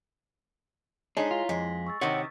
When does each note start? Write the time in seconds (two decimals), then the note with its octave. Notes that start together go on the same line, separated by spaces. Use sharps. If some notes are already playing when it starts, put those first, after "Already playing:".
1.17 G#3 D4 D#4 C#5 A#5 B6
1.31 E4 F4
1.49 F2 G#3 B6
1.87 C#6 E6 A6
2.01 C3 D#3 C#5 F#5